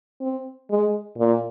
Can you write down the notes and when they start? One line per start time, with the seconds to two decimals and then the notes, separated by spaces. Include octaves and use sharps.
0.21 C4
0.70 G#3
1.18 A#2